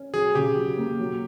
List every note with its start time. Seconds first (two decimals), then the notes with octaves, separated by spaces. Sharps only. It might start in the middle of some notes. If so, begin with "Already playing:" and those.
Already playing: C#4
0.14 F#3 G#4
0.35 C#3 G4
0.57 F#3
0.78 A#3
0.99 F#3